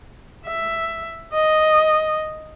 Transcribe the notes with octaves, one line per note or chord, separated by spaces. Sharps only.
E5
D#5